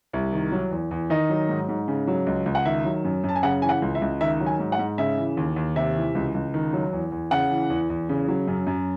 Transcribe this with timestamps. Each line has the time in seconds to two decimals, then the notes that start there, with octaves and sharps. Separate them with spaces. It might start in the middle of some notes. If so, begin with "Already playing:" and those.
0.13 C2
0.33 D#3
0.52 F#3
0.71 E2
0.91 E2
1.10 D#3 D#5
1.30 F#3
1.49 G#2
1.69 G#2
1.88 C#3
2.07 F#3
2.26 C#2
2.46 C#2
2.55 F#5
2.65 D#3 E5
2.85 F#3
3.04 F#2
3.24 F#2 A5
3.36 G#5
3.43 C#3 F#5
3.62 E3 G#5
3.69 F#5
3.82 C#2
3.95 E5
4.02 C#2
4.21 D#3 E5
4.40 F#3
4.46 G#5
4.59 G#2
4.72 F#5
4.79 G#2
4.98 C#3 E5
5.17 E3
5.37 D#2
5.56 D#2
5.76 C3 E5
5.95 E3
6.15 C#2
6.34 C#2
6.54 D#3
6.73 F#3
6.93 E2
7.12 E2
7.31 C#3 F#5
7.50 E3
7.70 E2
7.90 E2
8.09 C#3
8.28 F#3
8.47 F#2
8.67 F#2